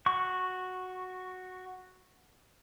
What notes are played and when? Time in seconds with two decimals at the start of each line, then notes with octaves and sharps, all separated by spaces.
0.06 F#4 C#6